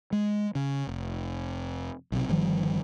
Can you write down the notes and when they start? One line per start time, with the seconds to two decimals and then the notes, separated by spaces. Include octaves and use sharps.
0.12 G#3
0.55 C#3
0.87 F1
2.12 B1 C3
2.29 G1 D#3 F3 G3